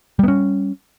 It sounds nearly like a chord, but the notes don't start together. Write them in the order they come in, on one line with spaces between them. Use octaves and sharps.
G3 B3 C#4